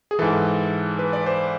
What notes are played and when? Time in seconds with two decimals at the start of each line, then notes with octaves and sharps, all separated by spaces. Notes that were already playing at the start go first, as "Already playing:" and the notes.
0.11 G#4
0.19 G#2 E3 A4
0.99 B4
1.13 D5
1.26 C5